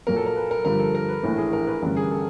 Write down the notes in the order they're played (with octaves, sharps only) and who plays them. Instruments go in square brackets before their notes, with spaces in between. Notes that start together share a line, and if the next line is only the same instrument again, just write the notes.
[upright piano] A#2 F#3 A#3 [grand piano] A#4
[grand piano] A4
A#4
B4
A#4
[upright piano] G2 D3 F3 [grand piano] A#4
[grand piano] A4
A#4
B4
[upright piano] A#1 A2 E3 A3 [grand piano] A#4
[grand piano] G#4
A#4
B4
[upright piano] A1 G2 D3 [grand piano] A#4
[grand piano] G#4
A4